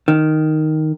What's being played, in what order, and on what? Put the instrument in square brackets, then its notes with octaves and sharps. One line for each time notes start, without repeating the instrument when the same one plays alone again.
[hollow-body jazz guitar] D#3